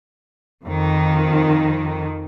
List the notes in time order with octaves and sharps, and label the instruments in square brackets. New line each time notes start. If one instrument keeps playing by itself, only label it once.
[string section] F2 D#3